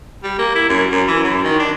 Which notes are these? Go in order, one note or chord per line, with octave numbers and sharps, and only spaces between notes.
G3
A#3
E4
F#2
F#2
E3
F#2
D#3
D4